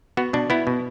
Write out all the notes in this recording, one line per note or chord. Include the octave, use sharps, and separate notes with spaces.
B3 F#4
B2 D4
B3 E4
B2